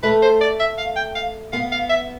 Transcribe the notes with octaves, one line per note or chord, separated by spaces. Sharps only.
A3 B4
C5
D5
E5
F5
G5
F5
B3 F5
F5
E5